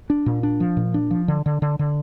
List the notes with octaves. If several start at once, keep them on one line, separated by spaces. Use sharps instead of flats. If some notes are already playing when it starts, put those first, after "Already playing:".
D4
A#2
D4
F3
A#2
D4
F3
D3
D3
D3
D3